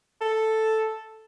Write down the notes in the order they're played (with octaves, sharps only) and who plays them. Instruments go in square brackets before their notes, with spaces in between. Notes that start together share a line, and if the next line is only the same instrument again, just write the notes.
[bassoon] A4